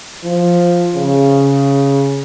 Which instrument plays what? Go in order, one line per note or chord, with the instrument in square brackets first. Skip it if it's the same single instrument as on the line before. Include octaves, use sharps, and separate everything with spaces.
[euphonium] F3
C#3